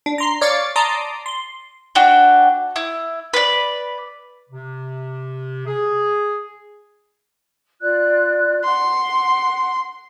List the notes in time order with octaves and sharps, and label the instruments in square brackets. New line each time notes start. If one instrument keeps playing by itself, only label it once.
[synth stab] D4
A#5 C6 C7
C#5 D5 F5 D6 A6 C#7
D5 A5 A#5 C6 D6 D#6
C6
[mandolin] D4 F#4 G5
E4
B4 D5
[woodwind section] C3
G#4
[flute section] F4 D5 F#6
[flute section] F#5 [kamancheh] C6